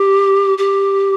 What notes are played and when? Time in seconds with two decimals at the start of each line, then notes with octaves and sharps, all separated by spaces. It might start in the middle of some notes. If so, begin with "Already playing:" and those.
Already playing: G4
0.58 G4